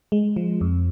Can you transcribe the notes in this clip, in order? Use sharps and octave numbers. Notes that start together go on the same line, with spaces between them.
G#3
F3
F2